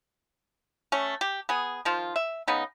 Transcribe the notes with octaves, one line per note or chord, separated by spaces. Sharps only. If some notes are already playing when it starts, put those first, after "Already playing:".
A3 C#4
G4
B3 G#4
D#3 F3 F4
E5
C#3 B3 D#4